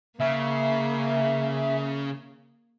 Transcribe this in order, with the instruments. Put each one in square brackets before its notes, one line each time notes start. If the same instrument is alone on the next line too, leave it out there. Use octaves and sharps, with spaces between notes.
[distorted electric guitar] C#3 [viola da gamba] A#3 [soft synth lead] E5